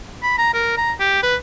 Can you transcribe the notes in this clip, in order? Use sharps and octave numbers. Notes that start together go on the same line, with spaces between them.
B5
A#5
A#4
A#5
G4
B4